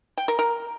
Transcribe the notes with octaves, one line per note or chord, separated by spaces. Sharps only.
G5
A#4
A#4